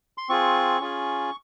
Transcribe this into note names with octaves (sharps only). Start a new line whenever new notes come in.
C6
C4 F4 G#4 C#6
C#4 F4 G#4